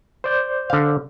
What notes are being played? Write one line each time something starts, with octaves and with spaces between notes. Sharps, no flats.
C5 D5 G6
D3 F5